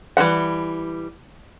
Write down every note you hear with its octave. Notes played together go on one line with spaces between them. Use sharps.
E3 G3 D#4 F#5